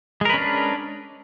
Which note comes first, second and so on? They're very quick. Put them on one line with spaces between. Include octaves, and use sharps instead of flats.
G#3 A#4 B4 C#4 D4